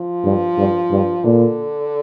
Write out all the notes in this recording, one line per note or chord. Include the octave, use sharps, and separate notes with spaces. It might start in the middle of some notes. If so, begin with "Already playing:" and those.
Already playing: F3
G2
G2
G2
A#2 D3